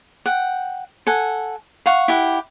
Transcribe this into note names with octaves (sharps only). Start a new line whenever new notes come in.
F#5 G5
A4 F#5 G#5
F5 F#5 C#6
E4 G4 F#5